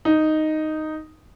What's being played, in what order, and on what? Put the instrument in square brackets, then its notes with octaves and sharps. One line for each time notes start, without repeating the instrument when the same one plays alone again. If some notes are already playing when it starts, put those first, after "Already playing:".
[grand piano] D#4